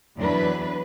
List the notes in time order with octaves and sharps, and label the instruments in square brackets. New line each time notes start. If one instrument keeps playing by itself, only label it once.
[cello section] E2 F#3 D4 B4